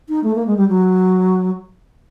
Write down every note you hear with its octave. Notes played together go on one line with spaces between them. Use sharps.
D#4
A3
A#3
G#3
G3
F#3